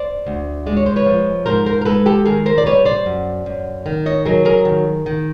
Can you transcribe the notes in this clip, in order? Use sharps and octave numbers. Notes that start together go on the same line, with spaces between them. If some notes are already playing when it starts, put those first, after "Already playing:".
Already playing: C5 D5
D2
G#3 D5
C#5
C5
B4 C#5
F3
G#2 A#4 C5
A#4 C5
A#4
G#3 A4 B4
G4 A4
D#3 G#4 A#4
A#4 C5
D5
G3 B4 C#5
C5 D5
F#2
F#2
D#3
C#5 D#5
F#3 G#4 A#4
G#4 A#4
D#3
D#3